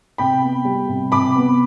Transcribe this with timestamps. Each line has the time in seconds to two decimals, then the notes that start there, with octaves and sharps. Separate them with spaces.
0.18 C3 G5 B5
0.42 B3
0.65 G3
0.89 C3
1.12 C3 B5 D6
1.36 B3